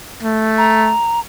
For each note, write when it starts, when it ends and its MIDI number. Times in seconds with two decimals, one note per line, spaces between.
0.23 0.94 57
0.58 1.20 82